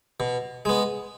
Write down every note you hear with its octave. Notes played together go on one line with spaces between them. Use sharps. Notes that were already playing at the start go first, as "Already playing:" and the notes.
B2
G#3 B3